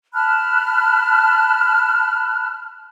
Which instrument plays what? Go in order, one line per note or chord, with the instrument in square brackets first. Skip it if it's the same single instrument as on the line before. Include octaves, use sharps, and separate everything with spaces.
[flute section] A5 B5 F6 F#6